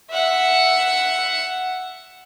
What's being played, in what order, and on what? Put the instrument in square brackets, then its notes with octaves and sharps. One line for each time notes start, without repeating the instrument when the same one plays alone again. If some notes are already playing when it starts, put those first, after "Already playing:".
[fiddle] E5 F#5